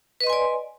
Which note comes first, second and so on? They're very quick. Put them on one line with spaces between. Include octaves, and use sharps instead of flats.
B4 D#5 C6 G#5 D5